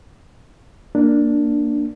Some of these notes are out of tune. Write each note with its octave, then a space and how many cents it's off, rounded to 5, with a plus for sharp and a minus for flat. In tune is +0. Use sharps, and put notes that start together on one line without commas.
A#3 +0 D4 +0